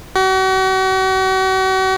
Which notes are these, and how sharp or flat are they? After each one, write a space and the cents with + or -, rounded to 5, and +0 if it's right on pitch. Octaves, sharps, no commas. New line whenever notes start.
F#4 +40